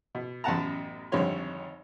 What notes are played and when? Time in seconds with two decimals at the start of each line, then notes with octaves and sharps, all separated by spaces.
0.15 B2
0.44 A1 F#2 B3 F#5 A5 A#5
1.12 G#1 F2 D3 G3 C#5 C6